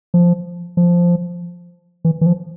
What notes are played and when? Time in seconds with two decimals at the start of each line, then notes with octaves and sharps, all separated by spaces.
0.14 F3
0.77 F3
2.05 E3
2.21 E3
2.26 F3